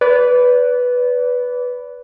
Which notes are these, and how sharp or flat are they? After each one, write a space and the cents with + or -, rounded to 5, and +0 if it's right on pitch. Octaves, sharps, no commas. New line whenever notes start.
B4 +0 D5 -30